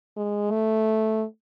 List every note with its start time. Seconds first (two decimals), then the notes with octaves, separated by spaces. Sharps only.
0.17 G#3
0.51 A3